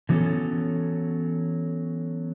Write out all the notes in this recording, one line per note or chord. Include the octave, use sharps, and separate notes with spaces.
D3 E3 F#3 B3 C#4 A4